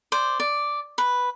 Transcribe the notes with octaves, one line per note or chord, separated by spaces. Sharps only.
C5 D5
D5
B4